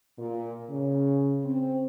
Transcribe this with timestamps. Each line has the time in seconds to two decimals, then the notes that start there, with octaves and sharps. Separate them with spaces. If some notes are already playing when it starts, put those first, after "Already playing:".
0.17 A#2
0.68 C#3
1.44 C4